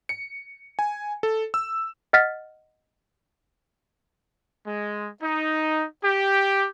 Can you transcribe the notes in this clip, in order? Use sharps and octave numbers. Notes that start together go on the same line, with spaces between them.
C#7
G#5
A4
E6
D#5 F#5 F6 A6 B6
G#3
D#4
G4